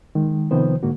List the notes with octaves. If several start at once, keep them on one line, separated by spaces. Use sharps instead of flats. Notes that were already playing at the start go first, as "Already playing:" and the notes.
D#3 G#3
C3 D#3 F3 B3 C5
G#2 D3 A#3 F#4